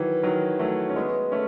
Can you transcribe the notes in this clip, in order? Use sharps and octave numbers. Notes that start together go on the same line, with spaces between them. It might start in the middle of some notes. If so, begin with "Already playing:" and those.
Already playing: D#3 E3 F#3
D#3 F#3
F#3 A3
C#4
G#3 B3
A3 C#4